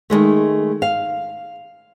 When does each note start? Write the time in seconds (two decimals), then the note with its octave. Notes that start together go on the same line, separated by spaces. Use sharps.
0.10 D#3 E3 G#3 A3
0.82 F5